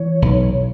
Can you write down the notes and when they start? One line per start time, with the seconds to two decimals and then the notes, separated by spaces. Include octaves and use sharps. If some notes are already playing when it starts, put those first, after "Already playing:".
Already playing: E3 C#5
0.22 B1